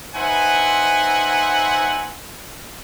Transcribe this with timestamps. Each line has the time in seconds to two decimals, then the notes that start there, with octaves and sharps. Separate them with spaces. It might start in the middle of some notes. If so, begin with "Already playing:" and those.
0.15 D#4 B4 C5 E5 F#5 G#5